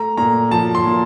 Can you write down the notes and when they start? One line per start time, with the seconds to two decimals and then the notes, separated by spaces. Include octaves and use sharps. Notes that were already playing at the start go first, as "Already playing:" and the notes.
Already playing: A3 A#5
0.17 A#2 A#5
0.51 F3 A5
0.75 C6
0.86 A#2